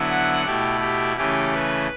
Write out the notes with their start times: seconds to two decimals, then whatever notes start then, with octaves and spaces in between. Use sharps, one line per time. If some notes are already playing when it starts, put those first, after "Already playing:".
Already playing: D3 F#3 B3 E4
0.09 F#5
0.45 B2 A3 E4 G4
0.80 G4
1.17 C#3 E3 A3 C#4 G4
1.52 B4